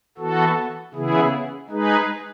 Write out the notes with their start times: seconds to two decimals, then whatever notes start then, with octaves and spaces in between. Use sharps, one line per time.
0.18 E3 B3 F#4 A4
0.94 C#3 E3 B3 E4 G#4
1.70 G#3 D#4 G#4 B4